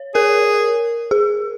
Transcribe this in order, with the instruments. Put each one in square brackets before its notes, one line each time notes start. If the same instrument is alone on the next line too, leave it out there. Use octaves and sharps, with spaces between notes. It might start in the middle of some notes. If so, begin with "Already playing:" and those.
Already playing: [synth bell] C#5
[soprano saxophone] G#4 [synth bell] A#4
[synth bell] G#4